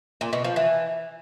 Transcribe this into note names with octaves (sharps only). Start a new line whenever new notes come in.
A#2
B2
F3
E3